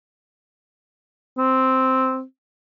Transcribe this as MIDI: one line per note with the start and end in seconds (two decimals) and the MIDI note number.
1.38 2.23 60